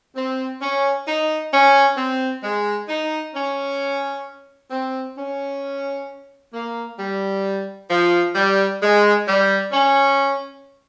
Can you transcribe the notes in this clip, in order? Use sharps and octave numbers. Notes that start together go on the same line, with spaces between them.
C4
C#4
D#4
C#4
C4
G#3
D#4
C#4
C4
C#4
A#3
G3
F3
G3
G#3
G3
C#4